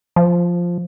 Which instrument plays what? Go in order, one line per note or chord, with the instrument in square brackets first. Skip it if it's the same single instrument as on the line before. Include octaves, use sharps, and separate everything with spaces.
[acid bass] F3